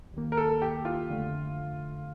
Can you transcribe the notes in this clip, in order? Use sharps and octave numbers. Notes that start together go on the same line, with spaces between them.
D#2 D#3 A#3
A#4
A4
G4
F4
F2 D3 A3